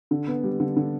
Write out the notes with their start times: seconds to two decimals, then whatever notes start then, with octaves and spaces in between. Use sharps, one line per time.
0.11 D3
0.28 B3
0.44 G3
0.60 D3
0.76 D3